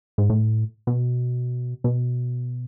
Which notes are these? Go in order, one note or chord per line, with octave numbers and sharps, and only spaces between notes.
G#2
A2
B2
B2